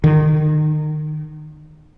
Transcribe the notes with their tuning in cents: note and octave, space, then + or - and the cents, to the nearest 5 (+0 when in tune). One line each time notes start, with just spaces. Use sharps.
D#3 -30